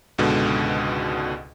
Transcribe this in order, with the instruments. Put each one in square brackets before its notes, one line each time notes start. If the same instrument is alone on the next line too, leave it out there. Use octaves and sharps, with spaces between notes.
[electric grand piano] C#2 G#2 B2 D3